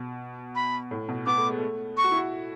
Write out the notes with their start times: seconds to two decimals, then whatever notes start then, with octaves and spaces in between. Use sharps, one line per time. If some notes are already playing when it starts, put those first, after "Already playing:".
Already playing: B2
0.55 B5
0.91 A2
1.09 B2
1.26 B3 D6
1.38 A3
1.49 G#3
1.59 A3
1.97 C#6
2.04 F#4
2.11 E4
2.18 F#4